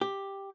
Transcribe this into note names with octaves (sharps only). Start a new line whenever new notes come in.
G4